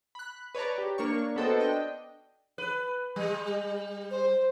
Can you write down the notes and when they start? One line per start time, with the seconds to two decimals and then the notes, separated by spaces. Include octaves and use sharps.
0.15 B5 F#6
0.55 B4 C#5 D5 A5 A#5
0.78 G4
0.98 A#3 D4 C#5 C#6
1.36 B3 F#4 A4 C5 D#5 G5
1.58 D4 D#5 G5
2.58 B4
3.16 G3
4.11 C5